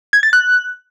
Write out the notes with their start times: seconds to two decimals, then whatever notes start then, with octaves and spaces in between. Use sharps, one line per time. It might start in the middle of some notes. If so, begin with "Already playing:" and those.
0.13 G#6
0.23 A6
0.33 F#6